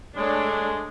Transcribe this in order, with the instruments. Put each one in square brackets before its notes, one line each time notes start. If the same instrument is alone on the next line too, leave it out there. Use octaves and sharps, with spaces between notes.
[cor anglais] G#3 [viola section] A3 D4 C#5